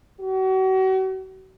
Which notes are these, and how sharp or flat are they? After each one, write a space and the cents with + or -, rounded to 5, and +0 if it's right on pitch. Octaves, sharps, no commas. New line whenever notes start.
F#4 +40